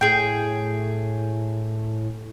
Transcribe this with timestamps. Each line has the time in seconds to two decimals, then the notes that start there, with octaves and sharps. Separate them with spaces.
0.01 A2 G#4 G5